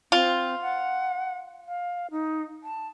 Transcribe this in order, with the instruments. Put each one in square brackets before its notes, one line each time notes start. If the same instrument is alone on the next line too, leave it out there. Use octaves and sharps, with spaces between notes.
[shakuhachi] C4 [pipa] F4
[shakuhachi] F#5
F5
D#4
A5